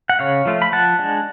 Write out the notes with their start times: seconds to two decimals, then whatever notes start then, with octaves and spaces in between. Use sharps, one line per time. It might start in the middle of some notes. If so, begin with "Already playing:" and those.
0.10 F#5
0.19 C#3 C#5 F5
0.45 F3 A3 F4
0.62 B5
0.72 F3 F#5 A5
0.99 G#3 D4